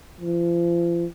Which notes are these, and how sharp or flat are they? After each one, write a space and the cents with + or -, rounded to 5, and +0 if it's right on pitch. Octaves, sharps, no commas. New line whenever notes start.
F3 -35